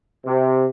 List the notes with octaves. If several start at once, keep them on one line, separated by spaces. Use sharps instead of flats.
C3